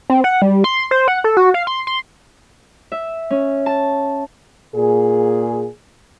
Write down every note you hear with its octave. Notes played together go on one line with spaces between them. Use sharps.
C4
F#5
G3
C6
C5
F#5
A4
F#4
F5
C6
C6
E5
C#4
A5
A#2 G#4